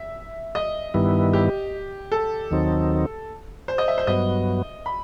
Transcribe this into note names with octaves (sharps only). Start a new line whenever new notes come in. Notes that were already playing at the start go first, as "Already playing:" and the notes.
Already playing: E5
D#5
G2 D#3 G3 B3 E4
G4
A4
D#2 D#3 F#3 C4 D#4
C5
D#5
E5
C5
G2 F#3 B3 D#5
B5